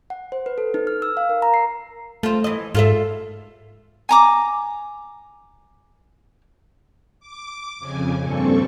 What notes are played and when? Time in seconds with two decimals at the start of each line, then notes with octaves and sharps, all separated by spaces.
0.10 F#5
0.32 C5
0.46 B4
0.58 A4
0.74 D#4
0.87 F6
1.02 E6
1.17 F5
1.29 A#4
1.42 A#5
1.54 C7
2.23 A3 C4 F4
2.44 E3 D#5
2.75 G#2 F4 A4 E5
4.09 G#5 A#5 D6
7.20 D6
7.79 F2 C#3 G#5
8.20 G2 A#2 C4 A4 C#6